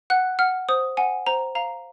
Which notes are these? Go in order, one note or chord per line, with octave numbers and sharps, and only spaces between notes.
F#5 F#6
F#5 F6
C5 D#6
F#5 G#5
C5 A#5
F5 A#5